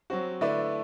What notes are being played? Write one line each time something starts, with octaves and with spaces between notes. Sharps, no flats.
F#3 C4 F#4
D3 A3 E4 B4 D5